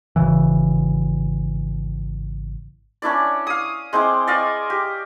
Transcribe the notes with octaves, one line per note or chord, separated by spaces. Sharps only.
G#1 C#2 C#3 E3
C#4 D4 E4 D5
F5 D#6
G#3 C4 E4 D6
D5 D#5 F5 C#6
G4